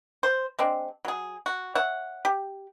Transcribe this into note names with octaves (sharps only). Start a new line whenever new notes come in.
C5
G#3 C4 D4
F#3 G#4
F#4
C#5 E5 F#5
G4